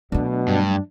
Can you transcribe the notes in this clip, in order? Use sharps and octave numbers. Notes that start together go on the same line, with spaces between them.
B2 F#3 A3 D4
G2 D4